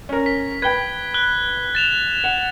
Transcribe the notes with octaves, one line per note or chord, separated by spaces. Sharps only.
C#4 A#4
B6
B4 G5 G#6 G7
F#6 G7
A6 E7 F7
F#5